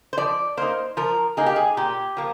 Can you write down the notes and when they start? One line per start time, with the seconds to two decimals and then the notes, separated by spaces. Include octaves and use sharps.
0.13 C5
0.18 F3 D5
0.57 A#3 D#4 C5
0.97 F3 A#4
1.37 A#3 D#4 G#4
1.46 G4
1.56 G#4
1.77 A#2 G4
2.17 F3 A#3